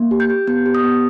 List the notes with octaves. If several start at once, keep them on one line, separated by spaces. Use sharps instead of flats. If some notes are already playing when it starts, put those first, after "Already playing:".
Already playing: A#3
G4
G6
G4
B3 G6
G4
D#6
B3